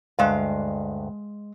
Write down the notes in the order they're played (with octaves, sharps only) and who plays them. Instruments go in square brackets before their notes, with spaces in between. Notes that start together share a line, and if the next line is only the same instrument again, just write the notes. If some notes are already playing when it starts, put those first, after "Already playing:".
[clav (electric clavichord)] D2 G2 [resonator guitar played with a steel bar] G#3 F5